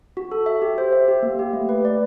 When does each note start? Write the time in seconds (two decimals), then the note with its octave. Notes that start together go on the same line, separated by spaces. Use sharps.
0.17 F#4
0.32 A4
0.46 E5
0.62 G4
0.78 C5
0.93 E5
1.08 G4
1.23 A#3
1.39 G4
1.53 A3
1.69 B4
1.85 D5